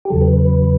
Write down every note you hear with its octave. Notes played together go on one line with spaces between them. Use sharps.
G4
E2 C#3 F#3 A4
B4
B4
B4